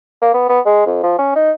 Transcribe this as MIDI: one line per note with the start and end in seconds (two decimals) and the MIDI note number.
0.22 0.31 58
0.34 0.44 59
0.49 0.60 59
0.65 0.86 56
0.86 0.99 41
1.03 1.14 53
1.19 1.33 61
1.35 1.51 63